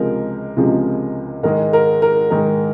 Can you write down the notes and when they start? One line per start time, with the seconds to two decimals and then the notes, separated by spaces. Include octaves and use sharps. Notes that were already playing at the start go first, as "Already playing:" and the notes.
Already playing: C#2 C3 F3 G#3 A#4
0.57 C#2 C3 F3 G#3
1.43 G#2 D#3 G#3 A#4
1.73 A#4
2.02 A#4
2.30 G#2 D#3 G#3 A#4